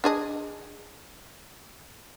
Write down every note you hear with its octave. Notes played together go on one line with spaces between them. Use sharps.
D4 G#4 D#5